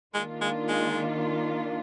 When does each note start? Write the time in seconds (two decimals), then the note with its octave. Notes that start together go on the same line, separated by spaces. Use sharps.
0.14 D#3 G#3 A#3 D4 F4
0.41 G#3
0.68 G#3